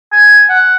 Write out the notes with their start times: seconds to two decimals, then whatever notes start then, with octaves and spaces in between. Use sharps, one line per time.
0.12 G#5
0.50 F#5